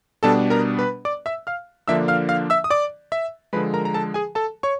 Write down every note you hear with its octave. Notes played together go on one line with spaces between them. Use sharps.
B2 G3 B3 D4 A4 A5
A#4 A#5
B4 B5
D5 D6
E5 E6
F5 F6
D3 F3 A#3 D4 E5 E6
F5 F6
F5 F6
E5 E6
D#6
D5 D6
E5 E6
D3 F3 G#3 B4 B5
A#4 A#5
A#5
A4 A5
G#4 G#5
A4 A5
C#5 C#6